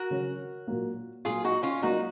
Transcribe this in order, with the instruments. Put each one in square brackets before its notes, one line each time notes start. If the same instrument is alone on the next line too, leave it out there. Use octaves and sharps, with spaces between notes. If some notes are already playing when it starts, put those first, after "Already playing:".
Already playing: [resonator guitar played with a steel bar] F#4 A#4
[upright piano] C#3 F#3 C#4
A#2 F#3 A#3
[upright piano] A#2 F#3 A#3 [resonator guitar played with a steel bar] F4 G#4
[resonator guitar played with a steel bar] D#4 F#4
C#4 F4
[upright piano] F#3 A#3 F4 A#4 [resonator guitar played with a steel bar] D#4 F#4